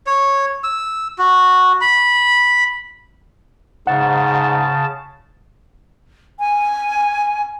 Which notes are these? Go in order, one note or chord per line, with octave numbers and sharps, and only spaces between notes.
C#5
E6
F#4
B5
G#2 C#3 F#5 A5
G#5